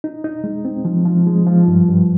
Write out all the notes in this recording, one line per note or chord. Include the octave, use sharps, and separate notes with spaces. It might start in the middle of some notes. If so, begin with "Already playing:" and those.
D#4
D#4
G#3
C4
F3
F3
G#3
F3
G2
G2